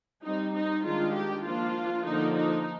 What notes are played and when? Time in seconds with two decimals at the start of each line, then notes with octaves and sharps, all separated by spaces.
0.23 G3 C4 D#4
0.53 D#4
0.83 D#3 G#3 D4 F4
1.13 G4
1.43 F3 A#3 D4 F4
2.04 D3 F3 A#3 D4 D#4
2.34 D#4